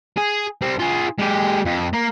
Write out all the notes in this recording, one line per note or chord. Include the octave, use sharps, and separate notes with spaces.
G#4
G3 C4
F4 G#4
G#3 G4
F2
A#3